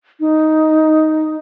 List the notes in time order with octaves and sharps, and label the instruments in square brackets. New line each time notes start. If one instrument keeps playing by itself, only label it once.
[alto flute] D#4